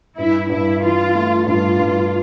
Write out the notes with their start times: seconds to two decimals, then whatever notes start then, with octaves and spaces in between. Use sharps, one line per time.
0.17 G2 E4
0.50 G2 E4
0.82 E3 F4
1.15 A3
1.47 G2 F4
1.79 G2